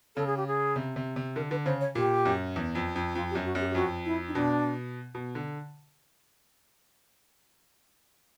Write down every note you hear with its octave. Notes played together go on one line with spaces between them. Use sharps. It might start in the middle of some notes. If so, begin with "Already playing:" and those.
C#3 A4
G#4
G4
G#4
C3
C3
C3
D3 A#4
D3 B4
C#3 C5
C#5
A#2 G4
F#2
E2
F2
F2
F2 F4
G4
F#2
F#4
F#2
G4
G4
F2 F#4
E4
D#4
B2 D4
B2
D3